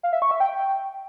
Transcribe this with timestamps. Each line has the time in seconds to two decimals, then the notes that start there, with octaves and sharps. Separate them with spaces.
0.03 F5
0.13 E5
0.22 C#6
0.31 E5
0.40 G5